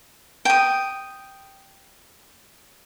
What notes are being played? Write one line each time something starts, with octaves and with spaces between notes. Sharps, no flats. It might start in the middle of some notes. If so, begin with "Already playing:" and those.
G5 D#6